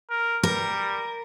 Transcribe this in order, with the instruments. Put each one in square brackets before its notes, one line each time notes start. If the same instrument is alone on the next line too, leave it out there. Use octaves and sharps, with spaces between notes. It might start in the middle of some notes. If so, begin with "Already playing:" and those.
[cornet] A#4
[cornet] G3 [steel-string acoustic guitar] A#4